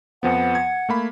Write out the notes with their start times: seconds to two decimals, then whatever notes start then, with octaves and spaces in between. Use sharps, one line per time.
0.23 F2 F3 B3 F#5
0.55 G#6
0.89 A3 A#3 B5